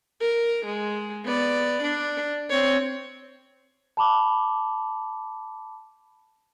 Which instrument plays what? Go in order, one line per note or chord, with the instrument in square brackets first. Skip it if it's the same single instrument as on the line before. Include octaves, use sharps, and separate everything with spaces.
[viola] A#4
G#3
B3 D5
D4
C4 C#5
[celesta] A5 B5 D6